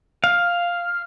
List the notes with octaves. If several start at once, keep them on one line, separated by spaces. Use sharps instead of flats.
F5